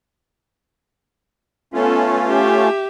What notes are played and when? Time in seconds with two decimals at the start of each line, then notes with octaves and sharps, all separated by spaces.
1.74 A3 B3 C#4 F4 A4 B4
2.27 G4 E5